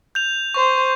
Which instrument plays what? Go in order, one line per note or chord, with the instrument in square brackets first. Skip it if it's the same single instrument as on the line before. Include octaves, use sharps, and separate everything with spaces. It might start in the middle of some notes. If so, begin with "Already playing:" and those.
[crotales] G6 F7
[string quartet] C5 [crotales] C#6